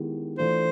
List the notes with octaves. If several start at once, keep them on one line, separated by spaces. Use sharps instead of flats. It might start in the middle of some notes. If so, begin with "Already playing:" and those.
Already playing: D#3 G#3 B3 E4 G4
E3 A3 D4 F4 C5